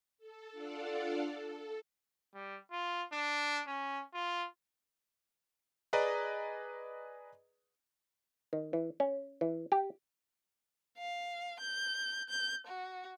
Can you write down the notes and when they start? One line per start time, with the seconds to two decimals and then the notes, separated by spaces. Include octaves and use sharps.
0.18 A4
0.52 D4 F4 A4 D5 F5 F#5
1.27 A4
2.34 G3
2.71 F4
3.13 D4
3.67 C#4
4.14 F4
5.93 G#4 B4 D5 D#5 G#5 A#5
8.53 D#3
8.73 E3
9.00 C#4
9.41 E3
9.72 G4
10.98 F5
11.60 G6
12.30 G6
12.67 F#4